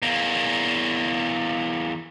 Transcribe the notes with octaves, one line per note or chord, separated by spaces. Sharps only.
E2 A#3